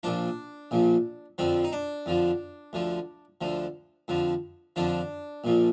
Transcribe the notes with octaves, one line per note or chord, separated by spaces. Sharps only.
A#1 A#2 F3 D4
A#1 A#2 F3
F2 D3 F3 C4
D#4
D4
F2 D3 F3
D2 D3 F3
D2 D3 F3
F2 D3 F3
F2 D3 F3 D4
A#1 A#2 F3